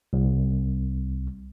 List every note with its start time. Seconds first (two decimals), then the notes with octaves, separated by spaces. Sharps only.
0.13 C2